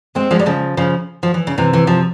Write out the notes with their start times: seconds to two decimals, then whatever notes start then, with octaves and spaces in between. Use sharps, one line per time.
0.15 G#3 C4
0.31 F3 G#3
0.39 G3
0.46 C#3 F3
0.77 C#3 F3
1.23 F3
1.34 E3
1.47 C#3
1.58 C3 E3
1.73 E3
1.87 F3